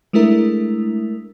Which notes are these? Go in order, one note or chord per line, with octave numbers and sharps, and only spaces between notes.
G#3 A3 D4 E4 A#4